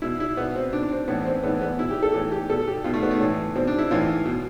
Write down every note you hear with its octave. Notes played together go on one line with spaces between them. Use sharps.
B2 E4
E4
B2 B3
C4
B2 D4
D4
C4
A2 E3 B3
C4
A2 E3 B3
B3
B2 E4
G4
A4
A2 E3 G4
G4
B2 A4
G4
B2 F4
A3
B3
A3
A2 E3
B2 C4
D4
E4
A2 E3 F4
B2